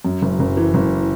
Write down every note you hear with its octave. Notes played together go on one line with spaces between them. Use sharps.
F#2
F#1
F#1
E3
F#1